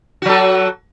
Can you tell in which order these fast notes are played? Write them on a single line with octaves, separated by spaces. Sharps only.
F#4 F#3 A4